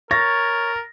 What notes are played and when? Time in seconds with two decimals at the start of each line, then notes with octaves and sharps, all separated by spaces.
0.11 A#4 C#5 A6 A#6